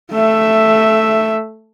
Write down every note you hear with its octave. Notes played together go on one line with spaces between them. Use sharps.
A3 E5